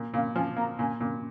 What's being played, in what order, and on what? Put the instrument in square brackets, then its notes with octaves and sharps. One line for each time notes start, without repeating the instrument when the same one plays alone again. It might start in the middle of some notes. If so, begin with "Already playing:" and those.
Already playing: [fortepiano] A#2
[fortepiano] A#2 [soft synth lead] F5
[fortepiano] F3 [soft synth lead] G#5
[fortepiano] A#3 [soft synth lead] A#5
[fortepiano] A#2 [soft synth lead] G#5
[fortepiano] A#2